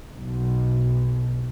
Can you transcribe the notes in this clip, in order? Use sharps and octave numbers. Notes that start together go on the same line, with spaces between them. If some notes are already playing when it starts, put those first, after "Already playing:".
B1